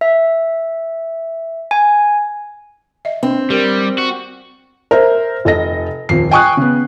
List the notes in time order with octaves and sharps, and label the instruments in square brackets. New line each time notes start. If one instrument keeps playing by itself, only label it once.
[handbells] E5
G#5
[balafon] D#5 E5
[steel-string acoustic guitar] C4 [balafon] D4
[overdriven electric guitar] G3 [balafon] G4 A#4
[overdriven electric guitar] F#4
[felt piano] A#4 C5 E5
F1 A4 D#5 A#6
D#1 F2 C7
G5 G#5 C#6 D#6 F#6
C#3 B3